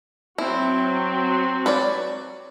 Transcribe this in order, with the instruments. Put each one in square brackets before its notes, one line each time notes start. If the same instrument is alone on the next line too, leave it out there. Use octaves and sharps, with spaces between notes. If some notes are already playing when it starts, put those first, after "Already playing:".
[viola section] F#3 C4 F#4 [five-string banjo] E4
[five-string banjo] B4 C#5 D5